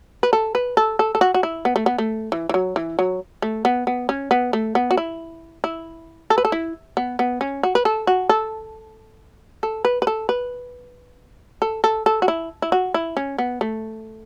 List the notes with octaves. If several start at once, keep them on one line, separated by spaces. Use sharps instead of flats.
B4
A4
B4
A4
A4
A4
F#4
F#4
E4
B3
A3
B3
A3
E3
E3
F#3
E3
F#3
A3
B3
B3
C#4
B3
A3
B3
F#4
E4
E4
A4
B4
A4
E4
B3
B3
C#4
F#4
B4
A4
F#4
A4
A4
B4
B4
A4
B4
A4
A4
A4
F#4
E4
E4
F#4
E4
C#4
B3
A3